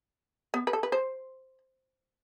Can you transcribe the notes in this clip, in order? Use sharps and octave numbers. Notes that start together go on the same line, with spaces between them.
B3
B4
A4
B4
C5